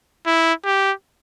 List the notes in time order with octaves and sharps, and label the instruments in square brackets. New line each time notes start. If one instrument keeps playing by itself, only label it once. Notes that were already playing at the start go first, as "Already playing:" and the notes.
[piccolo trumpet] E4
G4